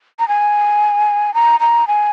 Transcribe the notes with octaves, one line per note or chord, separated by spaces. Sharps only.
A#5
G#5
A#5
A#5
G#5